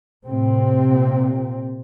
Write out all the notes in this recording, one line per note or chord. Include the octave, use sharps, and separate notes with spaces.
A2 C3 C4
A#2